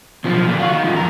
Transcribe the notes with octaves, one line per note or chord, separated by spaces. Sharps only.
B1 F3
A#2 D3
F4 F#4
D#3
G2 F3
F2 A#4